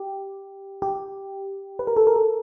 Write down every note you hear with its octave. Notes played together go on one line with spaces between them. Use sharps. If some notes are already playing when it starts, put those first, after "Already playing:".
Already playing: G4
G4
B4
A#4
A4
A#4
A4